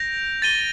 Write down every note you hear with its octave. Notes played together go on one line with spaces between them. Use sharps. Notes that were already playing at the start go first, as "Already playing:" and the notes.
Already playing: G6 A#6 D7 F7
A6 D#7 G7